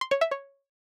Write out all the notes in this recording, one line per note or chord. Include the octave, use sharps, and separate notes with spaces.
C6
C#5
E5
C#5